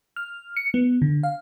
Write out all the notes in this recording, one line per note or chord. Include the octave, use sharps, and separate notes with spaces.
F6
C#7
B3
D3
F5